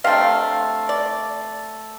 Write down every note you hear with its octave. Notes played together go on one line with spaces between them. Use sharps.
C3 A3 D4 F5
D5